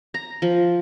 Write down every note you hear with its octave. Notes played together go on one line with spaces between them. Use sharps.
A#5
F3